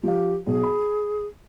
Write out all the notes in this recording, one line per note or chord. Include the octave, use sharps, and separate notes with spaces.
F3 G4 F5
B1 G#4
B5